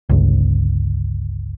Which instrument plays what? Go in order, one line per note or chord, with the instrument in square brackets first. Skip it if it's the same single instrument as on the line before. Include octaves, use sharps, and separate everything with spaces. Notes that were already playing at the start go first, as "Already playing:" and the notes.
[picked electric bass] G1 C#2